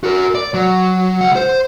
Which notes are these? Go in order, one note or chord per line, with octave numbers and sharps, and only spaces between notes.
F#4 A#4
D5
F#3
C#2 F#5
C5